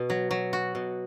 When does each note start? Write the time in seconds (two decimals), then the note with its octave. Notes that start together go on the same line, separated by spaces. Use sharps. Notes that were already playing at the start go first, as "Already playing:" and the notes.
Already playing: B2 F#4
0.10 F#3
0.31 F#3
0.53 F#4
0.75 B2